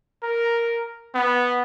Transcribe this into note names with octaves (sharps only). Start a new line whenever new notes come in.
A#4
B3